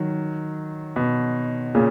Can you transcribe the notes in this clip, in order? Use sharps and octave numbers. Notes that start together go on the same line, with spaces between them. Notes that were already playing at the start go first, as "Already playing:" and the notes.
Already playing: D#3 F#3
B2
A#2 C#3